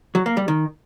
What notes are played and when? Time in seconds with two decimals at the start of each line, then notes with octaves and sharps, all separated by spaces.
0.15 F#3
0.26 A#3
0.37 G3
0.48 D#3